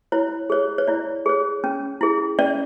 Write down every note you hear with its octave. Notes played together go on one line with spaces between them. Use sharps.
E4 C#5
G#4 C#5
C#5
E4 D5
G#4 C#5
C#4
E4 G#4
C#4 D5